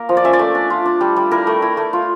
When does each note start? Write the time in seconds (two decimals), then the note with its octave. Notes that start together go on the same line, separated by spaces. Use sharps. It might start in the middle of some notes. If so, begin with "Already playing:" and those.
Already playing: A#3 A#4
0.09 F3
0.17 D5
0.24 C#4 E5
0.33 D5
0.39 A3
0.55 D4
0.70 F4
0.85 D4
1.01 G3
1.16 G3
1.31 E4 A#4
1.47 A3
1.62 E4
1.77 A3
1.93 F4